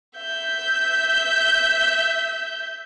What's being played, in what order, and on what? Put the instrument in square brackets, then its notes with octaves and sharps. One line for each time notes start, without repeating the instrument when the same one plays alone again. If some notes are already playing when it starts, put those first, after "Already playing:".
[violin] E5 G6